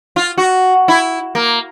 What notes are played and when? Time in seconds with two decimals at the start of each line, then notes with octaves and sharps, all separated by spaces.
0.16 F4
0.38 F#4
0.88 E4
1.35 A#3